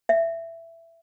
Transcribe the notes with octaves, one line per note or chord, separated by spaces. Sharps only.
E5